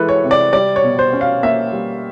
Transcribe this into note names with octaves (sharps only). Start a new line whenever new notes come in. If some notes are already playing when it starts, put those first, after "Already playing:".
Already playing: E3 G#3 A4 B4
C#5
C3
D5
G3 D5
C#5
B2
C5
C#4
F5
A#3 E5
G3